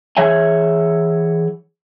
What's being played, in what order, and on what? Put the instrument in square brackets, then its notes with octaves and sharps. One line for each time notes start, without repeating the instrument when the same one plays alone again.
[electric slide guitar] E3 G#4 C#5 E5 G#5